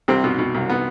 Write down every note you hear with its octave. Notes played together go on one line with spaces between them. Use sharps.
C2 C3 C4
B2
B2
C2
B3